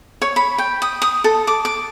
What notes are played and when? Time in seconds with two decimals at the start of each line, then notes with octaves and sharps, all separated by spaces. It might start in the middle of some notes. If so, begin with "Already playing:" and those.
0.22 C#5
0.36 B5
0.58 G5
0.82 D#6
1.02 D#6
1.24 A4
1.47 D6
1.65 D6